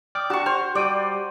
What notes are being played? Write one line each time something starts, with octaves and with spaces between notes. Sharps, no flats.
D5 G5 D6 D#6 F6
D4 F#4 G4 G5 A5 C#6
C5 F6
G4
G3 D5 G5 D6 D7 D#7